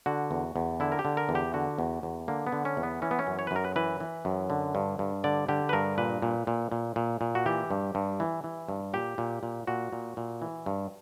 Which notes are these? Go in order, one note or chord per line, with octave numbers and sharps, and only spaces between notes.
D3 F#4
E2
E2
D3 E4
A#4
G4
D3
A#4
E2
G4
D3 F#4
E2
E2
D3 A#3
B3
D3
C#4
E2
B3
E3 C#4
B3
C#4
F#2
C#5
B4
F#2 A#4
B4
E3 B4
E3
F#2
D3
G2
G2
D3 D5
D3 G4
B4
G2 A#4
A#2 B4
A#2
A#2
A#2
A#2
A#2
F#4
E3 G4
G2
G2
E3
E3
G2
A#2 G4
A#2
A#2
A#2 F#4
A#2
A#2
E3
G2